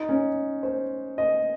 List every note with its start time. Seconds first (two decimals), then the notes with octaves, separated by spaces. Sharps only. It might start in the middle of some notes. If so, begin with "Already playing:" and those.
Already playing: D#4
0.09 C#4
0.63 C5
1.18 D#5